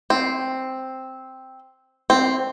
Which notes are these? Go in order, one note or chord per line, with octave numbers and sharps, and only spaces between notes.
C4
C4